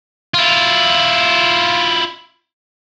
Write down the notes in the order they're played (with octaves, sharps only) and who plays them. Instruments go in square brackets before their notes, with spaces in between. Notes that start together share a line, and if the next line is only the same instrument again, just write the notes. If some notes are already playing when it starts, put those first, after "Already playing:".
[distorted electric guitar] E4 F4